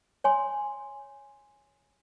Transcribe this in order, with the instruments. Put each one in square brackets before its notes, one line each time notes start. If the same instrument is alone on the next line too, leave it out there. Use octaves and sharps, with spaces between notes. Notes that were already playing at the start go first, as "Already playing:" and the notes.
[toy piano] C#5 G#5 C6